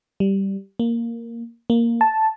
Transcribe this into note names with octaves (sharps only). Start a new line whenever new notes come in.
G3
A#3
A#3
A5